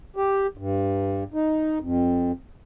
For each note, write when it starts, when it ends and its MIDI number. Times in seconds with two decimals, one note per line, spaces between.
0.16 0.47 67
0.57 1.24 43
1.34 1.78 63
1.80 2.32 41